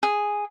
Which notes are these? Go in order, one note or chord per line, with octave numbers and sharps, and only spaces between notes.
G#4